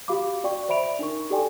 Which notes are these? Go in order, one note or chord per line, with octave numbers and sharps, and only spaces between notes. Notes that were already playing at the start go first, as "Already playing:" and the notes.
F#4 G4 F5 B5 D6
F#4 D5 G5 C#6
C5 D5 E5 B5 D7 F7
D4 D#4 A#4 C#6
G4 A4 D5 G5 G#5